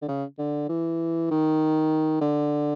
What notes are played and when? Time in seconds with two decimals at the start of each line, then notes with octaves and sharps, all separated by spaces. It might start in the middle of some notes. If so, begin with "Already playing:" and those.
0.02 D3
0.08 C#3
0.39 D3
0.69 E3
1.31 D#3
2.21 D3